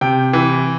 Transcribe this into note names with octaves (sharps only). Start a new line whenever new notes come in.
C3 G5
E3